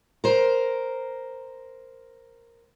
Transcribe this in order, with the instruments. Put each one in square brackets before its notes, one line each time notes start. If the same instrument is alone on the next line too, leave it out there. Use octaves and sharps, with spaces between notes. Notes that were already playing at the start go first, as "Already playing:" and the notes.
[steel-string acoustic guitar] A#4 C5